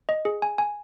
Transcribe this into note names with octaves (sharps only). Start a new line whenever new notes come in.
D#5
G#4
G#5
G#5